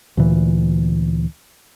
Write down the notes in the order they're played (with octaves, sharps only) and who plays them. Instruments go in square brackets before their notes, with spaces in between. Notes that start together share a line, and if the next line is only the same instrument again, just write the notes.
[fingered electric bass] D2 A#2 E3